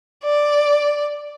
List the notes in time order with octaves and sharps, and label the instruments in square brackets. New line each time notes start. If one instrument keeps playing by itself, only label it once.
[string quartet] D5